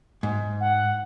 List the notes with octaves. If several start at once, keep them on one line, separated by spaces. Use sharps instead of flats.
G#2
F#5